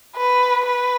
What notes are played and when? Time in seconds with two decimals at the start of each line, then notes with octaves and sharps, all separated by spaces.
0.17 B4
0.66 B4